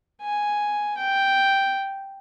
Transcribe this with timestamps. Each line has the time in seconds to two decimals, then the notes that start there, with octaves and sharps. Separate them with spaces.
0.22 G#5
0.98 G5